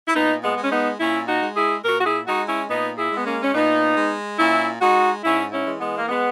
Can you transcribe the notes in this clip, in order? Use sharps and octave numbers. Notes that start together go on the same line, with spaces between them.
E4
A#2 B3 D#4
G#3 B3
G#3
C#4
B3 D#4
A#2 C#4 E4
D#4 F#4
G#3
E4 G#4
A#2 F#4 A#4
F#4
E4 G#4
G#3 D#4 F#4
C#4 E4
A#2 B3 D#4
E4 G#4
G#3 B3
A#3 C#4
C#4
A#2 B3 D#4
G#3
A#2 C#4 E4
G#3 D#4 F#4
G#2 C#4 E4
C#4 E4
E3 G#3
G#3 B3
A#3
G#3 B3